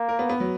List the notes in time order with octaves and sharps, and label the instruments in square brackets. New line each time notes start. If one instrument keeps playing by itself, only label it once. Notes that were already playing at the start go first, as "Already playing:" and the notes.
Already playing: [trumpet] A#3
[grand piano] A#4
B3
B3
F#3